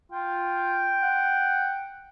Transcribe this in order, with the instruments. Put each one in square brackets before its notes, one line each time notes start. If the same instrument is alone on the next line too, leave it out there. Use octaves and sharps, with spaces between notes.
[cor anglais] F4 [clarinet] G5
[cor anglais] F#5